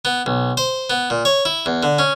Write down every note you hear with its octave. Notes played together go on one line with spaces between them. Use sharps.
B3
B1
C5
B3
A#2
C#5
E4
E2
D3
C#4